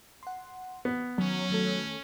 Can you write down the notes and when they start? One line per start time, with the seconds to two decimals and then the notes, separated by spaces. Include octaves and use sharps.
0.23 F#5 C6
0.85 B3
1.18 D#3 F#3 C#4
1.50 D#3 A3 A4